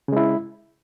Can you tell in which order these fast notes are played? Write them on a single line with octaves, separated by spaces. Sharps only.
C#3 G#3 E4